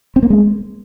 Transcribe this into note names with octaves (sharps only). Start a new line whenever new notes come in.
C4
A#3
G#3